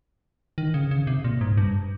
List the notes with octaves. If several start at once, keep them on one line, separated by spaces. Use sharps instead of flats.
D#3
C#3
C#3
C3
A#2
G#2
G2